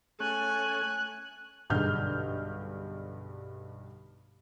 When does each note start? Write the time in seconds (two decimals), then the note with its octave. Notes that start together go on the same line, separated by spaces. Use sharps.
0.20 A3 C#4 G#5 F#6
1.70 B1 G2 D3 G#4 F6 G6